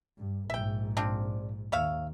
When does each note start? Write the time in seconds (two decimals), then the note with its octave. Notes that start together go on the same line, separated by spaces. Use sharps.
0.18 G2
0.50 A#1 G#2 E5 G5
0.97 C4 D4 F4
1.72 D#2 C#5 E5 F5